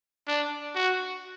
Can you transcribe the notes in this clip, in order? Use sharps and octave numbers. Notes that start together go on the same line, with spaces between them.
D4
F#4